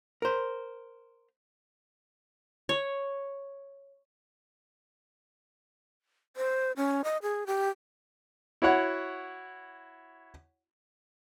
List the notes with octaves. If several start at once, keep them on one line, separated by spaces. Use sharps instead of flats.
A#4 C5
C#5
C5
C#4
D#5
G#4
G4
E4 F#4 C#5 F#5